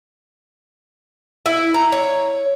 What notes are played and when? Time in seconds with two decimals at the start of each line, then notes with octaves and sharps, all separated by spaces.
1.46 E4
1.74 A#5
1.92 C#5